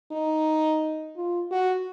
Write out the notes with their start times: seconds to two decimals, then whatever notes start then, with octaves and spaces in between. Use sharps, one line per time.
0.11 D#4
1.16 F4
1.51 F#4